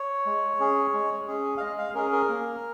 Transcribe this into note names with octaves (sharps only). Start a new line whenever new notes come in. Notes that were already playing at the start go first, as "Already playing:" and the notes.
Already playing: C#5
G#3
C#4 G#4
G#3
C#4 G#4
F5
G#3 D#5
F5
C#4 G#4 A#4
A#4
A#3